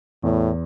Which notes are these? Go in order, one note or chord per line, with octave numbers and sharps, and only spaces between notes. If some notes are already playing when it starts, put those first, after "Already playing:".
E2 A2